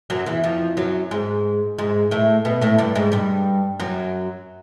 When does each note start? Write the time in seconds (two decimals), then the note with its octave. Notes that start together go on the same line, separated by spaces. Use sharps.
0.10 F#2 F#3
0.26 E2 E3
0.44 F2 F3
0.77 F#2 F#3
1.11 G#2 G#3
1.78 G#2 G#3
2.11 A2 A3
2.45 B2 B3
2.61 A2 A3
2.78 G2 G3
2.95 G#2 G#3
3.12 G2 G3
3.80 F#2 F#3